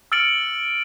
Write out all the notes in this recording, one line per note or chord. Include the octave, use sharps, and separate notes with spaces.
E6 F6 A6 C#7 D7 F#7